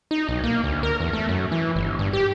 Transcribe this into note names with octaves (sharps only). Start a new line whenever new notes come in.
D#4
B1
A#3
D2
A#4
E2
A3
F#2
E3
G1
G2
G4